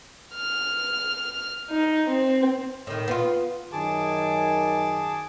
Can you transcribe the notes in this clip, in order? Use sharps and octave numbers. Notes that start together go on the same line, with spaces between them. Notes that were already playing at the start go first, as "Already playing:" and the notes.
F6
D#4
C4
A2 D#3
B3 F4
F#2 D#3 G#4 A5 D6